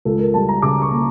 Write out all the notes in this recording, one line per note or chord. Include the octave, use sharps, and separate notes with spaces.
C#2 A4
A#4
G3 A5
A#5
C#3 D6
C#6
A#3